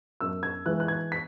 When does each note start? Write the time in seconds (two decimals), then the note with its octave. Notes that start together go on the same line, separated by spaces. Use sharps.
0.20 F#2 E6
0.43 G#6
0.66 E3 G#3 F#6
0.80 F#6
0.88 G#6
1.12 B6